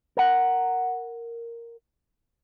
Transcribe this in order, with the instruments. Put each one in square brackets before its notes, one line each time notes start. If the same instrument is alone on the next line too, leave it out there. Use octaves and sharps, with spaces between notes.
[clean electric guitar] A#4 F#5